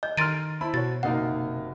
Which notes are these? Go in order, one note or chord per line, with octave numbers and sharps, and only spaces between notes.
D#5 G6
D#3 A#5 C6 F6 A6 D7 D#7
E4 C5 A5 B5
B2 F#4 C#5 A6
F#1 C3 A#3 D#4 F#4 A#4 F#5